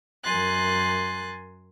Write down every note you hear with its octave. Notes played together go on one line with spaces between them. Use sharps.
F#2 A#4 G#5 C6 F#6 A6